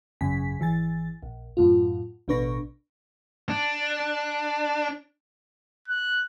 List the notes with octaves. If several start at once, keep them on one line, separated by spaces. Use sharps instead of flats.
G#1 F#2 C#3 G#5 B6
G#1 E3 G#5 A6
A#1
F#2 A2 F4
A1 B2 D4 B4 C#6 A#6
D4
F#6